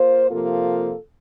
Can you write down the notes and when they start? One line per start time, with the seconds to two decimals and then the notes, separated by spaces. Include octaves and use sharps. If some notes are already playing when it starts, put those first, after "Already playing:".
Already playing: A#3 F4 C5
0.30 C3 F3 A#3 F4 A4